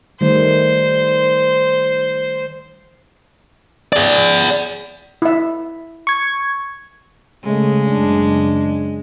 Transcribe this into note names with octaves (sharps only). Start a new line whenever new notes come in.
D#3 G3 A3 C5
G#4 D5
E4 E5
C#6 G#6
C#3 G#3 A3
F#1 D4